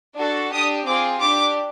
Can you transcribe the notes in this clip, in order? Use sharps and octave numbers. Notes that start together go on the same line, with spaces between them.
D4 F#4 A4
D4 G4 D#6
C4 F4 G#4 D6
D4 G4 D6